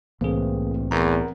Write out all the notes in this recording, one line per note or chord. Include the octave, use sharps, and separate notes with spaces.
C2 A2 E3 A#3 C4 G#4
E2 A#4 F#5 A#5